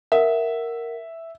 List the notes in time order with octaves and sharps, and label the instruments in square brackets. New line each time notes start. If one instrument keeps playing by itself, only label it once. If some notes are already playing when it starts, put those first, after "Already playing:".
[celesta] A#4 F#5 [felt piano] E5